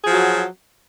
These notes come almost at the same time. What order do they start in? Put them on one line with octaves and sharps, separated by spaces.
G#4 F3 F#4 F#3